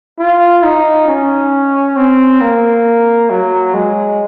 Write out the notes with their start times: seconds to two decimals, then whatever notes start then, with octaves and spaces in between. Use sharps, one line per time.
0.19 F4
0.63 D#4
1.07 C#4
1.96 C4
2.41 A#3
3.30 F#3
3.74 G#3